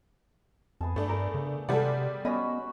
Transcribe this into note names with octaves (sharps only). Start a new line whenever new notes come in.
F2 B3 G#4 A5
G2 A3 D4
A#4
C#3
C3 G3 G#3 A4 B4 D5 F#5
B3 C#4 F#4 D#5 B5